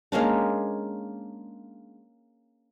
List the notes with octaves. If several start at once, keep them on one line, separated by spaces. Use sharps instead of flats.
G#3 A#3 C#4 D4